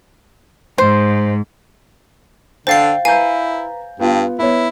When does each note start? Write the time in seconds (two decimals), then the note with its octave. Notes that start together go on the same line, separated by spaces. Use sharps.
0.78 G#2 C5
2.67 D3 C5 F5 G5 A6 C7
3.05 E4 B4 F5 G#5 A#5 G6
4.00 G2 B3 F4
4.39 B3 E4 C#5